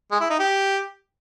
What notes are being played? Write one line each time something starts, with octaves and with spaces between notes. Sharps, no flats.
G#3
E4
D#4
G4